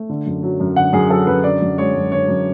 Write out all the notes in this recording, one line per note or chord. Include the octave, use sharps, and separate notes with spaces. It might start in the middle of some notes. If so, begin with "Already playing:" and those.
Already playing: A3
D3
F#2
F#3
F#2
D3 F#5
F#2 G#4
F#3 A4
F#2 B4
D3 D5
F#2
G#3 C#5
F#2
D3 C#5
F#2